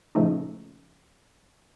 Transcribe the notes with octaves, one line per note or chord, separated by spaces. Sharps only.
A#2 C#3 F3 A3 D#4